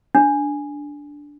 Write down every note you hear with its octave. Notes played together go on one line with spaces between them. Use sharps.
D4